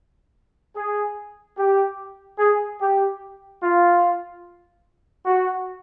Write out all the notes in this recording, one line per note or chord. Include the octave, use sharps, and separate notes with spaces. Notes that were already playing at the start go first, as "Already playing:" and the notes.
G#4
G4
G#4
G4
F4
F#4